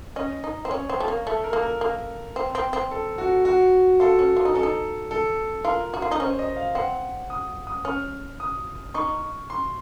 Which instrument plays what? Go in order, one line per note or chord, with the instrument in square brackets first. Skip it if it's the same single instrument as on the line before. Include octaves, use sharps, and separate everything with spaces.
[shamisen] C#4 [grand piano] D#5
[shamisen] D#4
C4
[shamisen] C#4 [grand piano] C#5
[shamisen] C4
A3
A#3
[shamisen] A3 [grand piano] A4
[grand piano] A#4
[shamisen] A#3
[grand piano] A#4
[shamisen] A#3
C4
C4
C4
[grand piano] A4
F#4
F#4
[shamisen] F4 [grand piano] A4
[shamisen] C#4
F4
D#4
[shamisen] C#4 [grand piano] A4
[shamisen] D#4
[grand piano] A4
[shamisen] F4 [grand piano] A#4
[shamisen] F#4
F4
D#4
[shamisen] C#4 [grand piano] C5
[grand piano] D#5
F5
[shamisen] C4 [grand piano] F#5
[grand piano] D#6
D#6
[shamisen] C#4 [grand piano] F6
[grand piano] D#6
[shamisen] D#4 [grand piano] C#6
[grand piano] C6